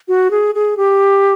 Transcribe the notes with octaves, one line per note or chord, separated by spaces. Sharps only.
F#4
G#4
G#4
G4